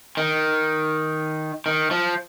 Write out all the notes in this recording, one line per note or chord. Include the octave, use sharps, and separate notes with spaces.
D#3
D#3
F3